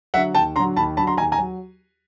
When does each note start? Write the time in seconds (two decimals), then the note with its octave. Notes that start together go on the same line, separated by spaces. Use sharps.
0.14 D3 F#3 E5 F#5
0.35 D#2 G5 A5
0.56 D3 A#5 C6
0.60 F#3
0.76 D#2 A5 B5
0.97 D3 F#3 A5 B5
1.07 A#5 C6
1.17 D#2 G#5 A#5
1.32 G#5 A#5
1.38 F#3